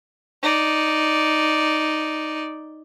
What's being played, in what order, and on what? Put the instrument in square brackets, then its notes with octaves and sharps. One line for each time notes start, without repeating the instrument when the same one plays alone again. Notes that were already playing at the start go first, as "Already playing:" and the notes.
[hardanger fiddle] D#4 D5